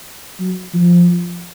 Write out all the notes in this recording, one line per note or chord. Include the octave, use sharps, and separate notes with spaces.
F#3
F3